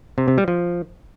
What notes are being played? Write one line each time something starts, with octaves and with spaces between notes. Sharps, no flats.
C3
C3
G3
F3